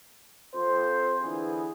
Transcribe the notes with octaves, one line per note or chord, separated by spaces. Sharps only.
F2 C5
D3 E3 B3 G#4